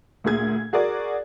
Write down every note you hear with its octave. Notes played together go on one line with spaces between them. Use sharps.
D2 A#2 G#4 G#6
F#4 G#4 A#4 D5